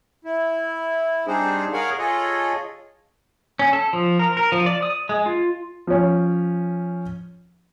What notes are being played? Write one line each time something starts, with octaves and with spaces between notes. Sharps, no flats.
E4
G3 C4 D4 D#4 G#4 C5
G#4 A#4 C#5 F5 F#5 G#5
F4 G#4 A4 C#5 D#5
C#4
A4
F3
A#4
A#4
F3
D5
D#6
G#3
F4
F3 C#4